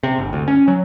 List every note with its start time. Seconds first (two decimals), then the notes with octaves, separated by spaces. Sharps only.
0.03 C3
0.19 G1
0.33 D2
0.48 C#4
0.68 F#3